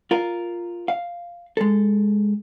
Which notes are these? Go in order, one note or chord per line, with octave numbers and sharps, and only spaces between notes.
F4 A#4
F5
G#3 A4